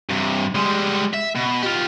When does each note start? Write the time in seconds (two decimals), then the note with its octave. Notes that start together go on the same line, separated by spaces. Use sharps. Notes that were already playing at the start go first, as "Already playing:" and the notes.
0.11 G2 C3
0.55 G3 G#3
1.14 E5
1.36 B2
1.63 F4 G4